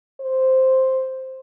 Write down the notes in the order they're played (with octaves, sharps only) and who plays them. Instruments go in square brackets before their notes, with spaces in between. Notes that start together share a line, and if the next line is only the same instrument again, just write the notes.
[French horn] C5